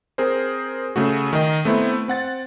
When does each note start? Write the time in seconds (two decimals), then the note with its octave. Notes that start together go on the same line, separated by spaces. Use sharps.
0.18 C4 G#4 A#4 C5
0.96 C#3 A3 F#4
1.33 D#3 D#5
1.65 A3 B3 C4 E4
2.08 C4 F#5 A6